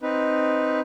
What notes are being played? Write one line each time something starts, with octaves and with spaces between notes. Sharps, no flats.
C4 D#4 B4